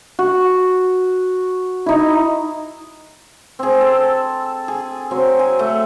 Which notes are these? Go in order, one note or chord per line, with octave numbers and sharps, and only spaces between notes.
F#4
D#4 E4
C4 G#4
A4
G#4
F#3 C4
G#5
A3